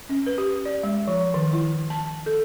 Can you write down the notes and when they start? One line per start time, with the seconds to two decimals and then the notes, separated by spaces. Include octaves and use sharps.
0.09 C#4
0.27 B4
0.38 G4
0.65 D5
0.83 G#3
1.08 F3
1.34 D#3
1.53 E4
1.90 A5
2.26 A4